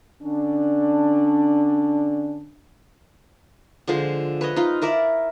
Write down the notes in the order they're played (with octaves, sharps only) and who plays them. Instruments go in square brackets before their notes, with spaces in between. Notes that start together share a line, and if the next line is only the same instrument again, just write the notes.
[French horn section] D3 C#4 D4
[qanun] D3 F3 G#3 C5
B4 C#5 D#5
D#4 F4
E4 A#4 D5 E5